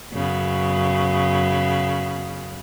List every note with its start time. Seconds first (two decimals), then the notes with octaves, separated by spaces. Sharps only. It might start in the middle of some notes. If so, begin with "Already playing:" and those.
0.14 F#2 C#3 B3